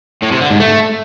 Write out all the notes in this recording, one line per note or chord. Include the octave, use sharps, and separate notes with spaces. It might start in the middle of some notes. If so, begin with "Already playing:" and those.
A2
C3
D3
G#2
A3